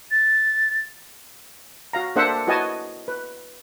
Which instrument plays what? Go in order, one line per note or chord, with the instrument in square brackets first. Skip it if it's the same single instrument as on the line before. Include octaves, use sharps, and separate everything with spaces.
[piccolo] A6
[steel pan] F#4 F5 A#5
A#3 D4 A4 C5 E5 F#5
E4 F#4 B4 D#5 G#5 A5
B4